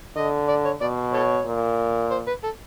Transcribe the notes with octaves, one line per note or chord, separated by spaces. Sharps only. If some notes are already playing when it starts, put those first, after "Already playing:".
D3 D#5
D5
C#5
B2 D5
A4 C#5
A#2
C5
B4
A4